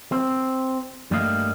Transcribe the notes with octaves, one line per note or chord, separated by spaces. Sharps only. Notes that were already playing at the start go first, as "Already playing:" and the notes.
C4
G2 G3 A3 A#3 D#5 F5